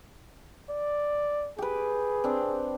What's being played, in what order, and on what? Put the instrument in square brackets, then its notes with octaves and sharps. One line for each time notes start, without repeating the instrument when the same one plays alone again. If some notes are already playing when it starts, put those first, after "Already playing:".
[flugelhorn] D5
[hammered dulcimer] G4 B4 [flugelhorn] G#4
[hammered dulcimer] C4 D4